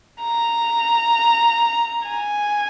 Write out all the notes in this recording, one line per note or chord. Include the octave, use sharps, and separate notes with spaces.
A#5
G#5